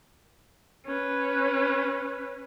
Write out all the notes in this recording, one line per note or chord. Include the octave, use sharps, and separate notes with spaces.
C#4 B4